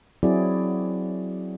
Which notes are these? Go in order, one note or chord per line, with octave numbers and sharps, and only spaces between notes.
F#3 C4 E4 F#4 G#4 D5